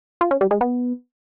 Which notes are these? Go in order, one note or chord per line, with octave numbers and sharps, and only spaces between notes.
F4
C#4
G3
G#3
B3